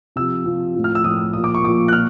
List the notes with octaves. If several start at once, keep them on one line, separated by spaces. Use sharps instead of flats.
C3 F3 E6
C3 F3
A2 F3
F6
E6
A2 F3 D#6
A#2 F3 D#6
D6
C#6
A#2 F3 D6
F#6
A#2 F6